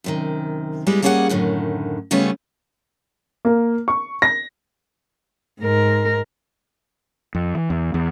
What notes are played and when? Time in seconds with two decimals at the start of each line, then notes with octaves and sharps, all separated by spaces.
0.04 F#2 C3 D#3
0.87 G3 G#3 B3 E4
1.02 G3 A#3 C#4 G#4 E5 F#5
1.29 F#2 A2 D3 D#3
2.11 C#3 G3 A3 B3 C#4 F4
3.45 A#3
3.88 C#6
4.22 A#6
5.60 G#2 A#4
7.35 F2
7.55 E3
7.70 E2
7.94 E2